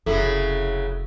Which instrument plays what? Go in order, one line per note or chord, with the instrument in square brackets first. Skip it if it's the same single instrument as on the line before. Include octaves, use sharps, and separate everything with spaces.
[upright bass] F1 [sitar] C#3 F#3 E4 [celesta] A4